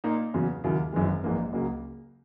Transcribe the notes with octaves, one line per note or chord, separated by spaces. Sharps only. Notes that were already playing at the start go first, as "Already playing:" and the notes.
A#2 A#3 D#4
E2 C#3 F#3
D#2 C#3 F#3 A#3 E4
G#1 F#2 E3 G#3
A#1 G#2 E3 A#3
C#2 C#3 F#3 A#3